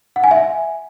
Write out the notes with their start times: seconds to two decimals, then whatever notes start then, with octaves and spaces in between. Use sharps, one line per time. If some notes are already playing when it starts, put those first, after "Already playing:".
0.16 F#5
0.24 G#5
0.31 E5